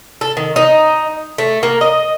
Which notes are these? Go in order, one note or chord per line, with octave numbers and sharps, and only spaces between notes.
A4
D#3
D#4
A3
A#3
D#5